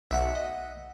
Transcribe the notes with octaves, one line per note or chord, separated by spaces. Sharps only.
B1 E5 F#5
D#5